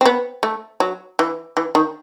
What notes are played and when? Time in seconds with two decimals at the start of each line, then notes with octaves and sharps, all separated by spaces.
0.01 C4
0.05 B3
0.43 A3
0.80 F#3
1.19 E3
1.57 E3
1.75 D#3